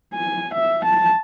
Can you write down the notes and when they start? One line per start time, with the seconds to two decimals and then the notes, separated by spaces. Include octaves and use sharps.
0.14 G#5
0.54 E5
0.85 A5